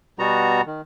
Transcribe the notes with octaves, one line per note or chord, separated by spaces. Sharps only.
B2 G3 B3 F#4 A#5
D#3